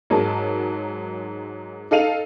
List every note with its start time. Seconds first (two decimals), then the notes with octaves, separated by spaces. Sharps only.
0.10 G#2 F#3 A#4 A5
1.91 D#4 A4 F5 D#7 F7